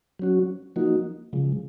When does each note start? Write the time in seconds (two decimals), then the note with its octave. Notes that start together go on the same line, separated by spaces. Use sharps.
0.19 F#3 C#4 F#4
0.76 F3 A#3 D#4 F#4
1.33 C#3 F3 G#3